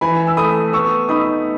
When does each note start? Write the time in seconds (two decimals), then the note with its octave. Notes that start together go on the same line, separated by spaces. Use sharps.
0.01 E3 G#5 B5
0.27 E6
0.37 A3 B5 D#6
0.73 B3 C#6 E6
1.09 D#4 B5 D#6